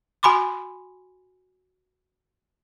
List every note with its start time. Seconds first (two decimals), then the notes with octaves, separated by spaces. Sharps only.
0.23 F#4 G#5 B5 C6 D6